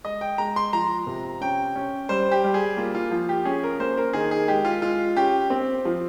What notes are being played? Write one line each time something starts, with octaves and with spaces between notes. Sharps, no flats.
G#3 D#5
G5
G#3 A#5
C6
F3 A#5
C3
C#4 G5
C#4
G3 C5
G4
G3
G#4
A#3 F4
F4
F3
G4
C#4 G#4
A#4
A#3 C5
A#4
D#3 G#4
G#4
G#3 G4
F4
G#3 F4
C#4 G4
C4
F3